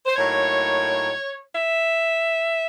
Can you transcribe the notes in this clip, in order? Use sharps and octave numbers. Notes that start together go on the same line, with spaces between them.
C5
A2 F#3 A#3 D#4 C#5
E5